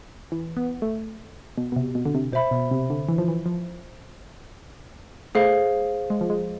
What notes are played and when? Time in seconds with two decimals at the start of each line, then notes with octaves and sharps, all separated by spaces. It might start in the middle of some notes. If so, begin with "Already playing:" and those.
0.32 E3
0.57 B3
0.82 A3
1.58 B2
1.72 B2
1.76 C3
1.95 B2
2.05 D3
2.15 C3
2.32 B2 C5 E5 B5
2.51 B2
2.71 C3
2.90 D3
3.09 E3
3.18 F3
3.28 E3
3.46 F3
5.35 A3 G#4 C5 F5
6.10 G#3
6.21 F3
6.30 G#3